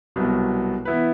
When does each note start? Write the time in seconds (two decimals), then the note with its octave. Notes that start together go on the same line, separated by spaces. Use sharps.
0.16 C2 B2 F#3 B3
0.85 E3 B3 E4 B4